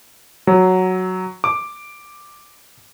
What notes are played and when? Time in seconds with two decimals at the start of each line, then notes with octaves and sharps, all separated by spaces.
0.47 F#3
1.44 D6